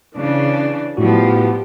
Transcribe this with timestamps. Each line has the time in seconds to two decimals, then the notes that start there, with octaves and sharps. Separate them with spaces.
0.16 C#3 E3 D4
0.97 A2 F3 G3 B3 F#4 G4